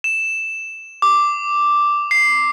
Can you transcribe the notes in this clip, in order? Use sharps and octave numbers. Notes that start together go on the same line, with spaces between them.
E7
D6
C7